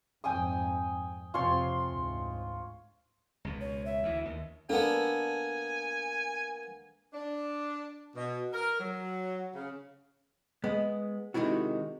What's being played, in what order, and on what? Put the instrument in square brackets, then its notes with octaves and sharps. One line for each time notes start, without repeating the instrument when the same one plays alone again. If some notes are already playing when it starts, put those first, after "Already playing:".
[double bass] F2 G#2 [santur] G5 G#5 D#6
[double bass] F2 C3 [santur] F4 C#5 C6
[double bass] D2 G#2
[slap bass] C#2 B2
[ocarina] C#5
E5
[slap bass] D2 E3
D#2
[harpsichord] A#3 B3 [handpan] D4 A4 [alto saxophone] G#5
[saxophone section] D4
B2
A#4
F#3
C#3
[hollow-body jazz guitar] G#3 B3
C3 D#3 G#3 E4 F#4